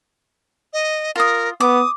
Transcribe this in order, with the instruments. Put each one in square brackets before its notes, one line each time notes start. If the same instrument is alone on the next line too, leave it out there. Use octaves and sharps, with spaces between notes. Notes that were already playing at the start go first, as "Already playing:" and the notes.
[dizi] D#5
[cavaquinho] F4 D#6 [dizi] A#4
[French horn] B3 [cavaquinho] D6 [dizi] D#6